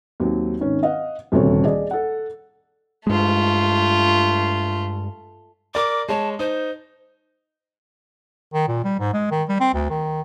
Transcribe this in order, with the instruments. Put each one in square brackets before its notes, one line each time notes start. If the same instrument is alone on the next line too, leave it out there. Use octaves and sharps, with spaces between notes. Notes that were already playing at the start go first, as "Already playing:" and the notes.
[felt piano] D#2 F#3 C4
G#1 D#3 C#4
D#5 F5 F#5
D#1 D2 C3 A3 C#5
G#4 D5 D#5
A4 F#5
[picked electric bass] G2 G#3 [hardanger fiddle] A3 F4
[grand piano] A#4 D5 [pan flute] D6
[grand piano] G#3 C#5 [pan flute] A5
[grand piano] D#4 [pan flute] C5
[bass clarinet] D#3
A#2
G3
G#2
G#3
D#3
G3
C4
D2
D#3